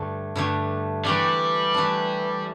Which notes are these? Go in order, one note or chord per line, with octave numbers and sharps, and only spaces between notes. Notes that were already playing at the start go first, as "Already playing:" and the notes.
Already playing: G2 D3 A3
G2 D3 A3
E3 G3 A3 D4
E3 A3 D4